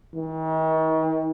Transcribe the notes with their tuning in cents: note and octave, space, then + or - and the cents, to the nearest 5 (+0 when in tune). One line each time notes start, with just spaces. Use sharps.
D#3 +45